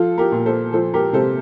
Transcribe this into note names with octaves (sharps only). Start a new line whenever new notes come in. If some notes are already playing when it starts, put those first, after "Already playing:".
Already playing: F3 F4 A4
G4 A#4
A#2
A4 C5
F3 A4 C5
G4 A#4
C3 A4 C5